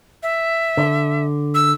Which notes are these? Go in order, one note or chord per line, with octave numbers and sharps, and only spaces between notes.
E5
D3
E6